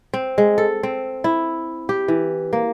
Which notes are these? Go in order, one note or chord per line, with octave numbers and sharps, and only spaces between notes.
C4
G#3
A4
C4
E4
G4
E3
A#3